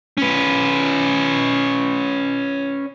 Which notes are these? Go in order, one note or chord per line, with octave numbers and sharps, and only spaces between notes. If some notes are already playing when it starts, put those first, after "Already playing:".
C#4 B4